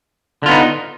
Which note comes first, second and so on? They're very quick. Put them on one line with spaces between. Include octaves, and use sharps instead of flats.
D3 F4 B3 D#4